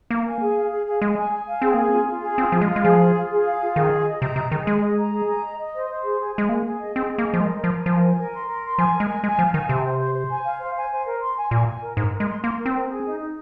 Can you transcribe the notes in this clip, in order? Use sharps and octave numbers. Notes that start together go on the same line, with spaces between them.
A#3 F5
G#5
G#4
F5
G#4
G#4
G#3 G#4
G#5
G#5
F5
C4 G#4
A#3 G#5
C4 F4
F4
G#4
C4 F4
F3 F4
G#3
F5
G#3
F3 G#4
F4
F4
G#4
F5
F4
D#3 G#4
D#5
D#5
C3 A#5
C3 D#5
D#3 G#4
G#3 D#5
G#4
A#5
G#4
A#5
D#5
D#5
C5
C5
G#4
G#4
G#3 G#4
A#3 G#4
G#4
D#5
C4 G#4
G#4
A#3
D#5
F3
G#3 A#4
A#4
F3
G#5
F3 A#4
G#5
A#4
C6
A#4
C6
F3 G#5
A#4
G#3
G#5
G#3 G#5
F3 F5
D#3 G#5
C3 C5
C5
C5
C5
G#5
F5
C5
G#5
C5
A#4
C6
G#5
A#2 G#5
G#5
A#4
G#2 A#4
A#4
G#3
C6
A#3 C6
A#4
C4
A#4
G#4
D#4
D#4